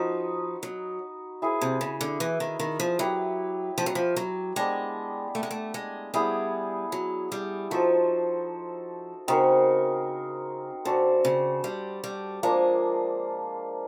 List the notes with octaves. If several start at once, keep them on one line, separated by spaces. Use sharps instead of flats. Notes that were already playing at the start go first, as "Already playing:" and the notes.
Already playing: F3 D#4 F#4 B4
F#3
E4 G#4 B4
C3
C#3
D3
E3
D#3
D#3
F3
F#3 E4 G4 B4
F3
F#3
F3
F#3
G#3 B3 D4 G4
A3
G#3
A3
G#3
G3 B3 E4 G#4
F#3
G3
F3 D#4 F#4 A4 C5
C#3 C4 D#4 F#4 A#4
C#3 D4 F#4 A4 C5
C#3
G3
G3
F3 G#3 A#3 D4